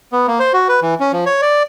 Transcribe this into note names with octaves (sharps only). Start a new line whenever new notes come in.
B3
A#3
C5
F#4
B4
E3
C#4
F3
C#5
D5